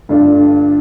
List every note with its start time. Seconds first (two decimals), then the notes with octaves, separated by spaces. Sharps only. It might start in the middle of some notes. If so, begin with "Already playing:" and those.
0.09 G2 D3 A3 D4 F4